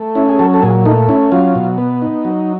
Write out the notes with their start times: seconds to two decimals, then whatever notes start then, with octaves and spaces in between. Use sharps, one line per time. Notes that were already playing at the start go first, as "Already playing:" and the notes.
Already playing: A3
0.15 C#4 E4
0.29 G#4
0.39 F#3 A4
0.54 A4
0.63 A#2 G#4
0.85 A3 D#4
1.09 C#4 E4
1.32 F#3 F4
1.55 B2
1.78 B3
2.02 D#4
2.25 F#3